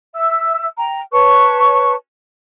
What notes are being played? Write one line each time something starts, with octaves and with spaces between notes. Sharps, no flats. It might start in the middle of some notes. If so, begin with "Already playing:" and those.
E5 E6
G5 A#5
B4 C#5 A5 C#6